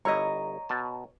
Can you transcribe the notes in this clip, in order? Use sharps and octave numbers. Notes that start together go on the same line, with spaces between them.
G1 E4 C#5 D#5 A#5
B2 A5